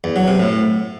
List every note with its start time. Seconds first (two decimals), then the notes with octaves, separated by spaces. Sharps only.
0.04 E2
0.16 F#3
0.28 C3
0.39 A2